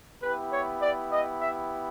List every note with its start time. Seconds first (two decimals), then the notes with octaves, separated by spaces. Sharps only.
0.22 B3 E4 G4 B4
0.51 C#5
0.81 D5
1.10 D#5
1.41 E5